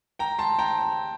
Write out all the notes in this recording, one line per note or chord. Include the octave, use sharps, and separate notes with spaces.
G5 A#5
A5 C6
G5 A#5